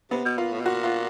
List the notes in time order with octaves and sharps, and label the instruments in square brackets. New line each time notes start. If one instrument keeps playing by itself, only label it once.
[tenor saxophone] C3 [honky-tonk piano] B3
[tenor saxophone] B2
[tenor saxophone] A#2 [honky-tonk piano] F4
[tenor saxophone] A2
B2
[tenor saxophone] A#2 [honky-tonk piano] F#4
[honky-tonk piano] F4